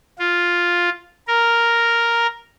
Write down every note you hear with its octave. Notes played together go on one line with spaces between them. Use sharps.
F4
A#4